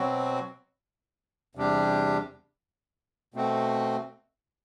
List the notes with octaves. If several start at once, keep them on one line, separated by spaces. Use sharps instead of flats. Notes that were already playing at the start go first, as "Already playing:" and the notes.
Already playing: B2 F#3 C4 F#4
E2 C3 G3 D4 G4
B2 A3 C4 F#4